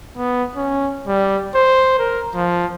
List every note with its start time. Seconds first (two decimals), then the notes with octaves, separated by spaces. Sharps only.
0.17 B3
0.56 C#4
1.07 G3
1.55 C5
1.99 A#4
2.35 F3